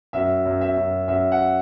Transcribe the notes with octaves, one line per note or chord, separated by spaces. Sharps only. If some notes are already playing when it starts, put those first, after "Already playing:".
F#2 E5
F#2
E5
F#2
F#2 E5
F#5